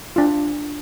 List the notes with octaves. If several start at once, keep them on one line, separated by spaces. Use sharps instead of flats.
D4 F4